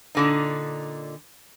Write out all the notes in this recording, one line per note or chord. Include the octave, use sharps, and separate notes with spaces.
A#2 D3 D#4